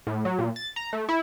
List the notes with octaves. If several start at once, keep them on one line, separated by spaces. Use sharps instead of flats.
A2
F#3
A#2
A6
A#5
A3
E4